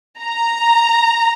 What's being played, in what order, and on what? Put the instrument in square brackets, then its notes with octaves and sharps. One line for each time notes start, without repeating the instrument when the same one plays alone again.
[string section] A#5